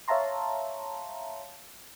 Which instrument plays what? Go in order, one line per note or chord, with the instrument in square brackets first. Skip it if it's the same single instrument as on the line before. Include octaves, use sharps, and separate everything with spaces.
[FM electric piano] C#5 E5 F5 A5 A#5 C6